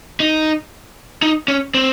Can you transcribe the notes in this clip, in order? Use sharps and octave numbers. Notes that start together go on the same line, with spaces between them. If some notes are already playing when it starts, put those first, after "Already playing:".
D#4
D#4
C#4
C4